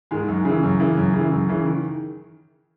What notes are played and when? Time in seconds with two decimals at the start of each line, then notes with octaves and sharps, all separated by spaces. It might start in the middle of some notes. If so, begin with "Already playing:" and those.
0.11 G#2 D#3 G#3
0.28 F#2
0.45 C#3 E3
0.63 F#2
0.80 C#3 E3
0.97 F#2
1.14 C#3
1.19 E3
1.32 F#2
1.49 C#3 E3
1.65 D#3